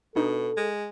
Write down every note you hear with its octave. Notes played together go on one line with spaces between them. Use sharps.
B2 D4 D#4 A4
G#3